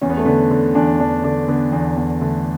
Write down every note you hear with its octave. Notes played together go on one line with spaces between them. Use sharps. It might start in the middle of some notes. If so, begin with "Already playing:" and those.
E2 C#4
B3
A3
D3 B3
D3
E2 D4
E2 D4
D3 D4
D3 B3
E2
E2
D3 A3